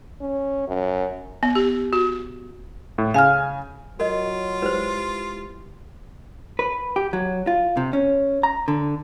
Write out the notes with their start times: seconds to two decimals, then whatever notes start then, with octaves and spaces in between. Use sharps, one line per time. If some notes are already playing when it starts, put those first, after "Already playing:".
0.20 C#4
0.67 F#2
1.43 B3
1.55 G4
1.93 F#4
2.98 A2
3.14 C#3 F5 G#5 F6
4.00 F#3 F4 A#4 D#5
4.62 G#3 E4 G4 B4 C5
6.59 B4
6.96 G4
7.13 F#3
7.47 F4
7.77 C3
7.93 C#4
8.43 A#5
8.68 D3